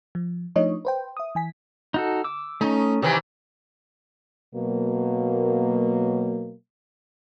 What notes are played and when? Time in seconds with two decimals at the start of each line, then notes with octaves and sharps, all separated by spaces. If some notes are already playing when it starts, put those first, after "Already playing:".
0.15 F3
0.56 F3 A3 D4 D#4 C#5 D#5
0.85 B4 C5 G5
1.17 E5 D#6
1.35 E3 G#5 B6
1.94 D#4 F#4 A4
2.24 D6 E6
2.61 A3 C#4 D#4
3.02 C3 D#3 E3 G4
4.55 B2 F#3 A#3